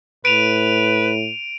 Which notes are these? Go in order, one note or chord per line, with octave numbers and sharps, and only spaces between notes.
A2 B4 D7 D#7 F7